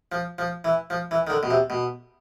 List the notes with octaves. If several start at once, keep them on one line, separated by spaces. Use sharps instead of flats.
F3
F3
E3
F3
E3
D#3
D3
B2
C3
B2